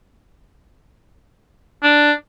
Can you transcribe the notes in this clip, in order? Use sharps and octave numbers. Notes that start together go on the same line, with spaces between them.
D4